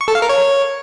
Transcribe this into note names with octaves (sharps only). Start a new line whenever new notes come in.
C#6
A4
F5
A#4
C#5